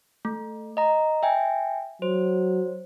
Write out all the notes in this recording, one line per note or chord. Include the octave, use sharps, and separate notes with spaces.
A3
D#5 A#5
E5 G5 G#5
F#3 C5